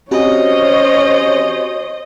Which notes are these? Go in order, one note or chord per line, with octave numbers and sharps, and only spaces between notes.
C4 C#4 F#4 G4 C5 C#5 D#5